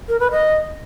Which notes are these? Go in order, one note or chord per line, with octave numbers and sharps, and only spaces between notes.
A#4
B4
D#5